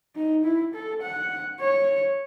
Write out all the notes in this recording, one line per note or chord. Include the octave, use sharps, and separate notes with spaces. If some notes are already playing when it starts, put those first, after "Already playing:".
D#4
E4
A4
F#5
C#5